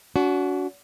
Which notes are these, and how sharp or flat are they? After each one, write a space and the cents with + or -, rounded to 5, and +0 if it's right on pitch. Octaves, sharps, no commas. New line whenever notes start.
D4 -45 F#4 +0